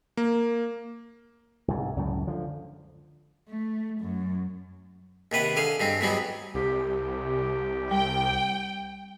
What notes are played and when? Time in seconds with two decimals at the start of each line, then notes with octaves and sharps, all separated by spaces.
0.17 A#3
1.68 C2 G#2
1.96 C#2 F#2 A2
2.27 D3 F3
3.49 A3
4.00 F#2
5.32 D#2 C3 B4 F#5
5.56 D3 G#4 F5
5.80 G2 G#3 C4
6.01 E2 G#2 F#3 G3 B3
6.54 C2 G4
7.91 G3 G5